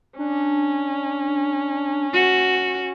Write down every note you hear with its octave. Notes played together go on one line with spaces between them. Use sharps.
C#4 D4
F#4